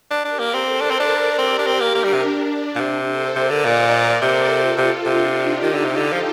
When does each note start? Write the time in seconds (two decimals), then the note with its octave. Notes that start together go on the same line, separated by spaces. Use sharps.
0.11 D4
0.25 D4 G4 A#4
0.39 A#3
0.53 C4 A4 C5
0.81 D4 A#4 D5
0.91 C4
1.00 D4
1.38 C4 G4 A#4
1.59 D4
1.67 C4 G4 A#4
1.80 A#3
1.95 A#3 D4
2.04 G3
2.13 C3
2.23 D4
2.76 A#2
2.80 C3
3.08 A4 C5
3.36 C3 A#4 D5
3.50 D3
3.65 A#2 C5 D#5
3.93 A#4 D5
4.21 C3 A4 C5
4.50 F4 A4
4.78 C3
5.06 C3 D4 F4
5.34 D#4 G4
5.63 D#3
5.74 D3
5.85 C3
5.91 F4 A4
5.96 D3
6.13 F3